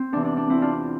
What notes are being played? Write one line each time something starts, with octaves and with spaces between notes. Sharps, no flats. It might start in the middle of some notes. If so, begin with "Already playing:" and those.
Already playing: C4
E2 C3 E3 D4
D4
D4
C4 E4
D4 F4